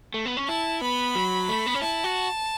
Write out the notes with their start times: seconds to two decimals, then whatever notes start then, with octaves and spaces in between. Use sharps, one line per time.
0.14 A3
0.26 B3
0.37 C#4
0.48 E4 A5
0.81 B3 B5
1.15 F#3
1.49 A3
1.66 B3
1.74 C#4
1.82 E4 A5
2.04 F#4